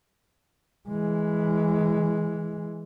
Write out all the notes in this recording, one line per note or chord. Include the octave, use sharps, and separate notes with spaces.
E3 G#3